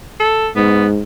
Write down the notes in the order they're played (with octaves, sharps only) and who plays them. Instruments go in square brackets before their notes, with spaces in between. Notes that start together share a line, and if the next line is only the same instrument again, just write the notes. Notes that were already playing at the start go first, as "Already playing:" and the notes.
[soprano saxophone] A4
[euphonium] G#2 [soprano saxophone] B3